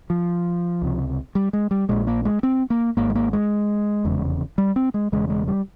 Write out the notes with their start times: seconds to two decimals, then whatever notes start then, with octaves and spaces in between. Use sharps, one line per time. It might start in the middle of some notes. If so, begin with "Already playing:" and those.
0.10 F3
0.82 C#2 C3
1.35 G3
1.53 G#3
1.71 G3
1.89 A#1 A#2 G#3
2.07 A#3
2.25 G#3
2.43 C4
2.70 A#3
2.97 G#1 G#2 A#3
3.10 G#3
3.15 A#3
3.33 G#3
4.05 F1 E2 C#3
4.58 G3
4.76 C4
4.94 G#3
5.12 E1 E2 C#3 G#3
5.30 G#3
5.48 G3